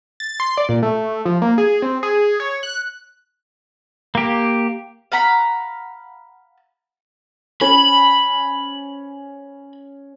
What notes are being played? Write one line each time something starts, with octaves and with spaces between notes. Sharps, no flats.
A6
C6
D5
A#2
A3
F3
A#3
G#4
C4
G#4
C#5
F#6
A#3 G4
F5 F#5 A#5 B5
C#4 C#5 B5